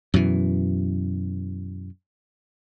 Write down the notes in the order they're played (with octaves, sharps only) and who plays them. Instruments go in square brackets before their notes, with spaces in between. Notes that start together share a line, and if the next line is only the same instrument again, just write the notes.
[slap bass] F#2 B2 E3